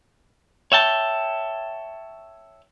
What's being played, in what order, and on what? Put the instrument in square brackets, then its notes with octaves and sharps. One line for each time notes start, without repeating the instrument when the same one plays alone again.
[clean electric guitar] C#5 E5 G5 A5